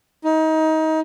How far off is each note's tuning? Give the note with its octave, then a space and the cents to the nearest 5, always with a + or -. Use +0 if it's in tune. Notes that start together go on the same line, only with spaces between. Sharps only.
D#4 +25